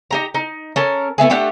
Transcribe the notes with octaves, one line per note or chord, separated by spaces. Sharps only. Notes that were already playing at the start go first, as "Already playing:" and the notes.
D#4 G4 A#5
D#4
C#4 A4 A#4
A3 B3 E4 G#4
A3 D4 G4 F#5